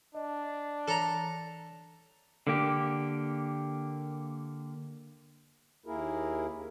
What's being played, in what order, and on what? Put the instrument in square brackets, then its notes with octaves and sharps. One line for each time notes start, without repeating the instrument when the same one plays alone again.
[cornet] D4 [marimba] D#5
[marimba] E3 C#5 [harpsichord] A4 A#5
[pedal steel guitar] D3 A#3 G4
[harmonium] D#2 A#3 E4 G#4 A#4